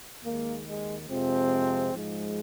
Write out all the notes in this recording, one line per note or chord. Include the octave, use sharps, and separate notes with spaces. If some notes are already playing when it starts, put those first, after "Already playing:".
D#2 D#3 G#3 A#3
G#3
F2 C3 F3 G#3 C4
G#2 F3 G#3